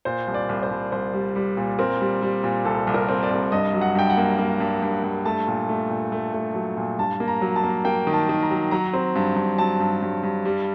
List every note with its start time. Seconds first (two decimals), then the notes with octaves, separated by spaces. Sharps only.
0.05 A#2 C5
0.27 C2
0.34 D5
0.49 C2
0.63 C5
0.70 C2
0.92 C2 C5
1.13 G3
1.36 G3
1.57 A#2
1.79 C4 A#4
2.01 G3
2.22 G3
2.44 A#2
2.65 C2 A4
2.87 C2
2.94 A#4
3.09 C4
3.23 D5
3.31 C2
3.52 G2 D#5
3.74 F#3
3.81 F#5
3.95 G2 G5
4.10 F#5
4.17 A#3
4.39 A#3
4.60 G2
4.82 G2
5.03 G2
5.25 A3 A5
5.48 A#2
5.69 A3
5.90 A#2
6.12 A3
6.34 A3
6.55 F#3
6.77 A#2
6.98 G2 A5
7.20 A#3
7.28 A#5
7.41 F#3
7.56 A5
7.64 A#3
7.85 A#3 G5
8.07 D#3
8.13 A5
8.29 D#3
8.43 A#5
8.50 F#3
8.71 F#3 A#5
8.94 C4
9.15 G2
9.36 G2
9.58 F#3 A5
9.80 G2
10.02 G2
10.23 G2
10.45 G3